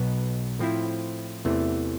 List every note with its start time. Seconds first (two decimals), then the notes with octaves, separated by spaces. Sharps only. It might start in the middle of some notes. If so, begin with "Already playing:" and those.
Already playing: B1 B2 B3
0.59 A2 F3 C4 E4
1.45 E2 C3 E3 A3